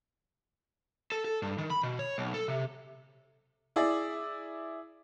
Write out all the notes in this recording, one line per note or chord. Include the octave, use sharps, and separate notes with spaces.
A4
A4
G2
D#3
B5
B2
C#5
B1
A4
C3
E4 G#4 D5